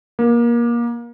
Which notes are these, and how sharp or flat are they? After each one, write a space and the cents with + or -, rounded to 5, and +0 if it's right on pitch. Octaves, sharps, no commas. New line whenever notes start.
A#3 +25